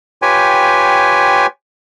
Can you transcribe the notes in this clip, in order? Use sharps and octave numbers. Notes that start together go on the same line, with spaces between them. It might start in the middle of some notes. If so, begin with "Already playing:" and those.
F4 G4 B4 C#5 G5 G#5